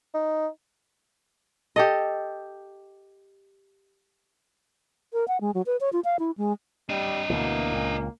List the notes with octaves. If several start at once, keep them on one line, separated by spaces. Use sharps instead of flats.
D#4
G4 A4 D#5
A#4
F#5
G#3
F#3
B4
C#5
F4
F5
E4
G#3
G3 D4 D#5
D2 B2 E3 A#3
C#2 A#2